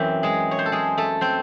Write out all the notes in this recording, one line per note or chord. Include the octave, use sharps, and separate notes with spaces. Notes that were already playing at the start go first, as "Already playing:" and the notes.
Already playing: F#2 E3 C4
G#3 G#4
C#5
C5
A4
G#3 G#4
A3 A4
C4 C5